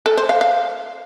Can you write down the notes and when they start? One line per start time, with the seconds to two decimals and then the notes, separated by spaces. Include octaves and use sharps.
0.06 A4
0.17 C5
0.29 F5
0.41 F5